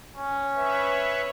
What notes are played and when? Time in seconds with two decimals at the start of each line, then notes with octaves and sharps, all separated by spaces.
0.16 C#4
0.55 B4 C#5 E5